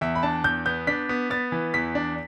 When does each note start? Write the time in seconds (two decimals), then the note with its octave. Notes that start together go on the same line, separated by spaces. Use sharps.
0.01 E2 E5
0.16 B5
0.23 D4 A5
0.44 E2 G6
0.66 B3 G6
0.87 D4 B6
1.09 B3
1.30 B3 A6
1.52 E3
1.74 E2 B6
1.95 D4